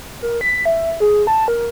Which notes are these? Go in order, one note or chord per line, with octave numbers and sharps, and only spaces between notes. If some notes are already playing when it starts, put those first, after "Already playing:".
A#4
B6
E5
G#4
A5
A#4